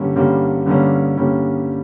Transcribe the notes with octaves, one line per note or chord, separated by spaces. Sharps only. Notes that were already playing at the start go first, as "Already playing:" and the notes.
Already playing: G2 D3 G3 A#3 C#4
G2 D3 G3 A#3 C#4
G2 D3 G3 A#3 C#4
G2 D3 G3 A#3 C#4